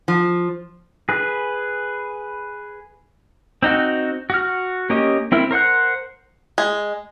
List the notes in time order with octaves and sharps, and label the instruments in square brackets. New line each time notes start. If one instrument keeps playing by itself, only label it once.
[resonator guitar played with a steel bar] F3
[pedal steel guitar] G#4 B4
C4 D#4 F#4
F#4 F6
A#3 C#4 G4 D#5
C4 E4 A#4
A#4 C5 F#5 F#6
[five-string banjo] G#3